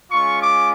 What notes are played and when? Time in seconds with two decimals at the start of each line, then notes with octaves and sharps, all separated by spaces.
0.11 G#3 C#4 F4 C#6
0.42 D6